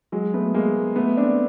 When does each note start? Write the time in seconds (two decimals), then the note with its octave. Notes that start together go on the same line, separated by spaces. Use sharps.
0.12 F#3 G#3
0.34 A3 B3
0.54 G#3 A#3
0.96 A3 B3
1.17 C4 D4